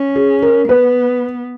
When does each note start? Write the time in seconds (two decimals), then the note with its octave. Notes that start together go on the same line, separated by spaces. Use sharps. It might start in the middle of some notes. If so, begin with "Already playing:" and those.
Already playing: C#4
0.16 G#4
0.42 A#4
0.68 B3 B4